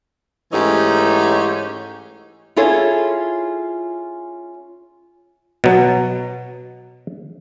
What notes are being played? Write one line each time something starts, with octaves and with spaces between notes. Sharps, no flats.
G#2 E3 A3 C#4 D#4 G4
C#4 E4 F4 G#4 A4 C#5
B2 F#3